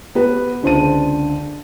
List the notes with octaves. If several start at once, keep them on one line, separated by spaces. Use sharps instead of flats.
B3 G4 B4
C#2 D3 C5 A5 D#7